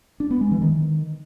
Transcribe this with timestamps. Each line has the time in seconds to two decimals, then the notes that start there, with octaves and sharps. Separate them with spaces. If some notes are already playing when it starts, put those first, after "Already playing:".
0.20 D4
0.30 B3
0.41 G#3
0.51 E3
0.62 D#3